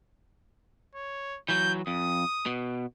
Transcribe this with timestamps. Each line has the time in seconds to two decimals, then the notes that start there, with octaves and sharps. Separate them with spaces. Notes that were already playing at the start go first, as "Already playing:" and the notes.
0.95 C#5
1.49 E3 F#3 G6
1.87 F2 D#6
2.46 B2